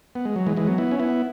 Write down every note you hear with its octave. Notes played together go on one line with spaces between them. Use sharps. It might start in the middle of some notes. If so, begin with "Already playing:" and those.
B3
G#3
F#3
E3 G#3
E3 G#3
F#3 B3
B3 E4
C#4
B3 E4